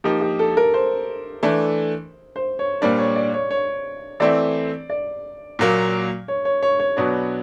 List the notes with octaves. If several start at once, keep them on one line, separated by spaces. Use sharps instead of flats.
F3 A#3 D#4 G4
G4
A4
A#4
C5
E3 A3 D4
C5
C#5
A#2 G3 A#3 D4 C5
C#5
D5
C#5
C#5
E3 A3 C4 E4 D5
D5
A#2 F#3 A#3
C#5
C#5
C#5
C#5
B2 F#3 B3 D4